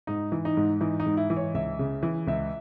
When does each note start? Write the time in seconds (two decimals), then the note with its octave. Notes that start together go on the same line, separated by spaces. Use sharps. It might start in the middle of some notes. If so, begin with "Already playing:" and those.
0.07 G#2 D#4
0.32 E3
0.45 D#4
0.57 G#2
0.81 E3 D#4
1.00 D#4
1.06 G#2
1.17 E4
1.30 E3
1.36 C#5
1.54 C#2 E5
1.79 C#3
2.03 E3
2.27 C#2 E5